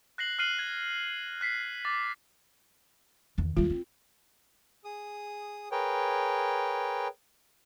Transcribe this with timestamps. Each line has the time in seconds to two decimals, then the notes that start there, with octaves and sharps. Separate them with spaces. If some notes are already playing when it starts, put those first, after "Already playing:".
0.18 F#6 A#6 C7 F#7
0.39 F6 F#6 C7 D#7 F#7
0.59 G#6
1.41 F#6 B6 C7
1.85 D6 A6
3.38 E2 D#3
3.57 D#2 G3 F4
3.70 C4
4.84 G#4 D#6
5.72 G#4 A#4 B4 C#5 G5